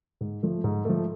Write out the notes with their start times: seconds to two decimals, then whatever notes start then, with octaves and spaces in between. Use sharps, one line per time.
0.21 G#2
0.43 F3 A3
0.64 G#2
0.85 F3 A3